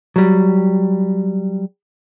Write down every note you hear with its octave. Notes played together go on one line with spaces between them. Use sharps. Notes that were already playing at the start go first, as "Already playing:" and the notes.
F#3 G3